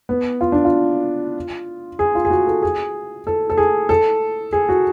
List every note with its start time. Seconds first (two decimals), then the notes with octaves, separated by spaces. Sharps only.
0.09 B3
0.41 F4
0.52 D4
0.65 F4
1.99 G#4
2.15 F4
2.25 G#4
2.30 F#4
2.47 A4
2.62 G#4
3.27 A4
3.50 A4
3.57 G#4
3.89 A4
4.53 G#4
4.69 F#4